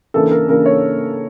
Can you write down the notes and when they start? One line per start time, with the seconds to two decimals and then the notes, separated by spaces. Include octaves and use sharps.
0.14 C#3 E3 A#3 D4 A4
0.31 A#4
0.49 C#3 E3 A#3 D4 A#4
0.66 C#5